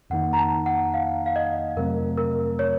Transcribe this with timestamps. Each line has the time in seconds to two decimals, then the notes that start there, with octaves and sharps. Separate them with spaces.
0.10 F2 D#3 A#3 D#4 F#5
0.33 A#5
0.38 A5
0.66 F#5
0.94 F5
1.26 F5
1.36 D#5
1.77 F2 C3 F#3 A3 C4 A#4
2.18 A#4
2.59 C#5